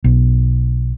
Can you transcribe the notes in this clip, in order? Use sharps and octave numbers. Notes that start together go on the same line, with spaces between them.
B1